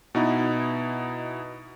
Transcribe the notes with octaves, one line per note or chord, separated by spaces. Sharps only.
B2 B3 D#4 E4